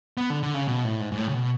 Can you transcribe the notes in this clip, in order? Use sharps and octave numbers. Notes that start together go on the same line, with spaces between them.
B3
D3
D3
C#3
B2
A2
G#2
G#2
A2
C#3
B2